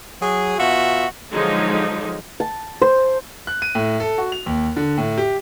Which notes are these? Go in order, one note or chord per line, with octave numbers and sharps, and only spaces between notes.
F#3 G#4
B2 F4 F#4 E5
D3 F3 F#3 G#3 D#4
A5
C5
F#6
D#7
A2
A4
F#4
F7
D#2
D3
A2
G4